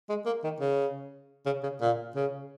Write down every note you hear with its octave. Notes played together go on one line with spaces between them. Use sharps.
G#3
A#3
D#3
C#3
C#3
C#3
A#2
C#3